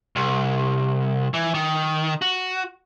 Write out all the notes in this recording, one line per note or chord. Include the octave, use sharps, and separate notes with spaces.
C2
E3
D#3
F#4